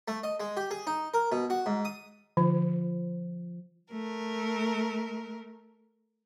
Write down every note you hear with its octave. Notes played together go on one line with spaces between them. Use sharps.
A3
D#5
G#3
G4
G#4
D#4
A#4
B2
F#4
G#2
D#6
D3 F3
A3 A#4